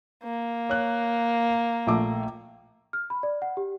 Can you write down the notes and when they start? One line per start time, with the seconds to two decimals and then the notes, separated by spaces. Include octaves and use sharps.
0.23 A#3
0.69 C#5 F#6
1.87 A#1 A3 D6
2.93 F6
3.10 B5
3.23 D5
3.42 F#5
3.57 G4